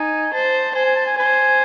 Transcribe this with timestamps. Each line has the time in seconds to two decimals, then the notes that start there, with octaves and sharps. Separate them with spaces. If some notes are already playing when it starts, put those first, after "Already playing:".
Already playing: D#4 G#5
0.33 C5 A5
0.75 C5 G#5
0.85 G#5
0.96 A5
1.06 G#5
1.17 C5 G#5